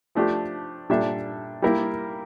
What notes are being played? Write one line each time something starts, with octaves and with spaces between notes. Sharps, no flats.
F3 A3 D4 G4
A#2 G3 D4 A4 E5
G3 A#3 E4 A#4